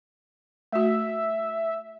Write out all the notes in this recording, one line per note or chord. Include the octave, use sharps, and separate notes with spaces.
A3 F#4 E5